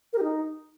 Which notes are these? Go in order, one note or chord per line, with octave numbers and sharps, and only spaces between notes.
A#4
G4
D#4